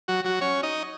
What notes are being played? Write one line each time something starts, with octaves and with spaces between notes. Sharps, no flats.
F#3 F#4
F#3 F#4
C#4 C#5
D#4 D#5